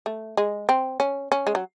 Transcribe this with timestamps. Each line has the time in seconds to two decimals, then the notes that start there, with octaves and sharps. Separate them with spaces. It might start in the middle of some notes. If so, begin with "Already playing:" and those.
0.06 A3
0.37 G#3
0.69 C4
1.00 C#4
1.32 C#4
1.47 G#3
1.55 F#3